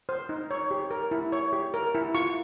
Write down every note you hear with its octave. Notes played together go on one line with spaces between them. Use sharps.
C5
D#4
C#5
G4
A#4
E4
C#5
G4
A#4
E4
F4 C#6